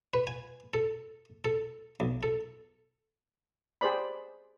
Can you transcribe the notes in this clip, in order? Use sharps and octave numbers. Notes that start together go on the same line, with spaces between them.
B4
G#5
A4
A4
B1
A4
G4 G#4 C5 D5 B5